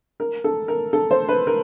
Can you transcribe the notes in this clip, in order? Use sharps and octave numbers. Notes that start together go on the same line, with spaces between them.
A#4
A4
A#4
A4
C5
B4
A#4